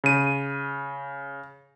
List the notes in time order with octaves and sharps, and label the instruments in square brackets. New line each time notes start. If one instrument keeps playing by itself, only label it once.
[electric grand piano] C#3 D#7